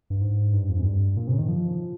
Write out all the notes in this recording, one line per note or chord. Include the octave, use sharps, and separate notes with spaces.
G2
G#2
G2
F2
G#2
G2
A#2
C3
C#3
D#3
F3